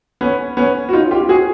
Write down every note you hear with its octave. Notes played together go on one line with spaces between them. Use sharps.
B3 C#4
B3 C#4
F#4
D#4 F4
F4 G4
F#4 G#4